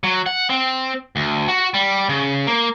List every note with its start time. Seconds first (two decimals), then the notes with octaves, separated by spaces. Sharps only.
0.04 F#3
0.26 F#5
0.49 C4
1.16 D2
1.48 F#4
1.74 G3
2.09 C#3
2.47 A#3